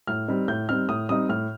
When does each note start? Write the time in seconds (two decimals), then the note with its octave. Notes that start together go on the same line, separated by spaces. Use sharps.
0.07 A2 F6
0.28 G3 C4 D#4
0.48 A2 G6
0.69 G3 C4 D#4 F6
0.89 A2 D#6
1.09 G3 C4 D#4 D#6
1.29 A2 F6